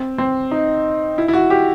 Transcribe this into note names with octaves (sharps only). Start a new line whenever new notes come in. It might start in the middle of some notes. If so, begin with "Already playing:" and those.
Already playing: C4
C4
D#4
E4
E4
F#4
G4